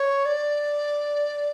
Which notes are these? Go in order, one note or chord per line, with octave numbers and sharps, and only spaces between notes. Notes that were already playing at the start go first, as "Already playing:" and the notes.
Already playing: C#5
D5